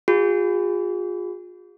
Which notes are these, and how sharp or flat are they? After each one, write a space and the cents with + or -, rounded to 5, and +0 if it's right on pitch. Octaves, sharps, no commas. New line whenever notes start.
F4 +35 G#4 -30